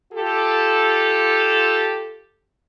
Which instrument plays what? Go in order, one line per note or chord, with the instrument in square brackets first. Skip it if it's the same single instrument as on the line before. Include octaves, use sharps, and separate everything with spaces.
[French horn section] F4 G4 A4